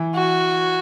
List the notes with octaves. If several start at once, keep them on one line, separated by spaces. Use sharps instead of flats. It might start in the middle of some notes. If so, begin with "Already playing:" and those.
Already playing: E3
F#4